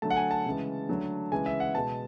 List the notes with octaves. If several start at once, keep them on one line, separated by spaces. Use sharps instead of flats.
D3 F#3 A3 A5
F#5
G#5
A5
C#3 E3 G#3
D3 F#3 A3
C#3 E3 G#3 G#5
E5
F#5
B2 G#3 A5